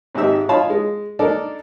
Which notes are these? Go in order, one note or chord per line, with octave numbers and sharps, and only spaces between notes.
G#1 G#2 D#4 G4 E5 E6
D#4 F4 C#5 F5 A5 B5
G#3
D4 D#4 A4 A#4 D5